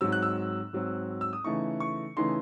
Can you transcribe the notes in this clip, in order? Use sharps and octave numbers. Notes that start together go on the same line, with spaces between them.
G#2 F#3 C4 E6
F#6
E6
G#2 F#3 C4
E6
D#6
C#3 E3 A3 D#4 C#6
C#6
C#3 E3 A3 D#4 C6